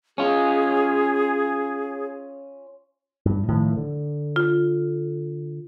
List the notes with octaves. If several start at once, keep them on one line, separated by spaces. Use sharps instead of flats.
C#4 F4 G#4
G2
A2 D#3 F3
D3
F4